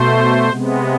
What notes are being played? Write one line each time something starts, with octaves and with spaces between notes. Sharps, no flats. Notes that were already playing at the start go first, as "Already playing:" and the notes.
Already playing: B2 A3 C5
C3 G#3 B3